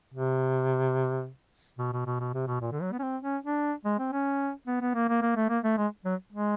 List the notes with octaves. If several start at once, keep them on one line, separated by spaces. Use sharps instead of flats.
C3
B2
B2
B2
B2
C3
B2
A#2
D3
F#3
B3
C#4
C4
C#4
D4
G#3
C4
C#4
B3
B3
A#3
A#3
A#3
A3
A#3
A3
G#3
F#3
G#3